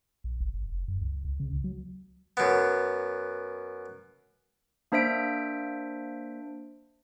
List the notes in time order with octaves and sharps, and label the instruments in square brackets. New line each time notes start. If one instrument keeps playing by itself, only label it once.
[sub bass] A#1
F#1
G1
F1
F#2
C#2
C#2
C#3
C#2
F#3
[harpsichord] F#2 B3
[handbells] A#3 D4 C5 E5 B6 D7